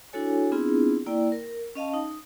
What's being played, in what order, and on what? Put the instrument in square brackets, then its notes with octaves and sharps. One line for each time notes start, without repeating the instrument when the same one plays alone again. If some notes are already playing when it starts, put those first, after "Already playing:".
[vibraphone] D4 E4 F#4 A4 C#5 G#5
B3 C4 D4 E4 F4 G#4
A#3 E4 D5 G5
A#4
C#4 D#5 F5 A5
D#4